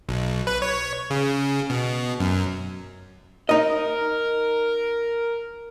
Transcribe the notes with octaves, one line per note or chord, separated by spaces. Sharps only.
B1
B4
C#5
C#3
B2
F#2
D#4 A#4 D#5